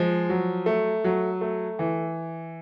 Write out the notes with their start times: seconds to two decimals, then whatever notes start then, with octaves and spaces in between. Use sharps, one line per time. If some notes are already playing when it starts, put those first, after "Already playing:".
Already playing: F3 G#3
0.29 F#3
0.66 A3
1.04 F#3
1.41 A3
1.79 E3